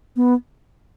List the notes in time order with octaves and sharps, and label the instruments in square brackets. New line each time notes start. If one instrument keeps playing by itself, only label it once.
[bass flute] B3